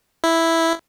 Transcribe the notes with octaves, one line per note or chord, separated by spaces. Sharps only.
E4